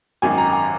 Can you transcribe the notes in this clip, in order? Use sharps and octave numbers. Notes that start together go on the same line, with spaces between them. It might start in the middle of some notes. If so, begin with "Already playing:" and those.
G#1 F#2 D#3 G#5
A#5
G#5